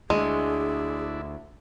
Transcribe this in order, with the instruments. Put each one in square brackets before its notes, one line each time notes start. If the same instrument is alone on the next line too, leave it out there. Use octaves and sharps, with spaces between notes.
[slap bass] D2 [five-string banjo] G#3 [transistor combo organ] D4 E4 [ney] G#4